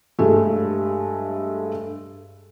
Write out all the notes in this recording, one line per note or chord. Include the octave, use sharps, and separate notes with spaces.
G2 G#3 A3